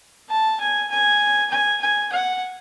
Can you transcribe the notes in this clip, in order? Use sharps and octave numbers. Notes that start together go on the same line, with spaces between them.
A5
G#5
G#5
G#5
G#5
F#5